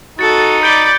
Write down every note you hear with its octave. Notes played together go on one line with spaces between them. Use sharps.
D#4 F#4 A4 A6 C#7
D5 B5 G6 D7 G7